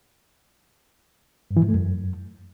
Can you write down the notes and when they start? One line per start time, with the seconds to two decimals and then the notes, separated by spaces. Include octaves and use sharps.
1.51 G2
1.57 E3
1.63 G#2
1.68 A3
1.74 F#2